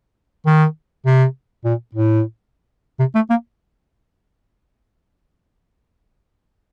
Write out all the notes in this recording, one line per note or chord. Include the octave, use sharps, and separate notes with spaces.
D#3
C3
A#2
A2
C3
A3
A#3